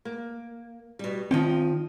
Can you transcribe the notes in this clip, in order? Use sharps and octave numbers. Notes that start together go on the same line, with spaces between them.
A#3
B2 G3
D#3 F3 C4 D#5 G5